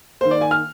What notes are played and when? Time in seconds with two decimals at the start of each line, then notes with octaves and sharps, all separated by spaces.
0.21 D#3 A#3 C5
0.31 D5
0.41 G#5
0.51 F6